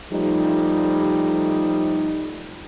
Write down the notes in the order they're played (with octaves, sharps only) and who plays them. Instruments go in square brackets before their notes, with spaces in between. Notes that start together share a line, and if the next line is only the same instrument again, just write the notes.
[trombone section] F3 G3 A3 D#4